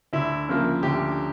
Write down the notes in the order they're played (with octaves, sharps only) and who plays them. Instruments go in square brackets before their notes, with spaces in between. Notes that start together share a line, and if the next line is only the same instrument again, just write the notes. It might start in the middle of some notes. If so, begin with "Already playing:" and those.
[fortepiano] D2 E4
C#3 F3 A#3
D2 G4